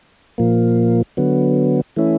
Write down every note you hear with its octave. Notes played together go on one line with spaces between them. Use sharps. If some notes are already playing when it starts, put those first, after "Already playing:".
A#2 F3 A#3
D3 F#3 B3
E3 A3 C#4 E4